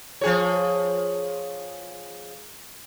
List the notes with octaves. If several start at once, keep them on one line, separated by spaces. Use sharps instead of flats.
F3 G#4 C#5